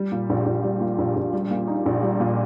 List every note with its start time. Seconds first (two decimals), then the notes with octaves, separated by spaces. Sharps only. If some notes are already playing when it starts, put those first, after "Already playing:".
Already playing: G3
0.12 A#2
0.29 A#1
0.46 A#1
0.64 G3
0.81 A#2
0.98 A#1
1.16 A#1
1.33 G3
1.51 A#2
1.67 D#4
1.86 A#1
2.02 G3
2.20 A#2